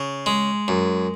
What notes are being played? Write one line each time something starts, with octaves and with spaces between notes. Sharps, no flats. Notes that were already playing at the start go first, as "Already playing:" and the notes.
Already playing: C#3
G#3
F#2